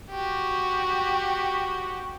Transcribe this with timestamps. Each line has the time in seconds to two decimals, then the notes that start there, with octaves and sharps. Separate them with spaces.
0.11 F#4 G4